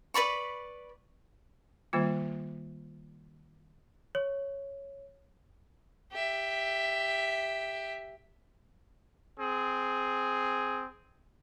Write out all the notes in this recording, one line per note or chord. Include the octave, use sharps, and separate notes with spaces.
B4 D5 B5 C#6
D#3 G3 A#3 F4
C#5
G4 E5
C4 G#4